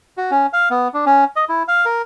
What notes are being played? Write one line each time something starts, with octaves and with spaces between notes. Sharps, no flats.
F#4
C#4
F5
B3
D4
C#4
D#5
E4
F5
A#4